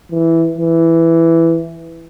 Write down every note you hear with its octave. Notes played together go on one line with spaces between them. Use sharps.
E3
E3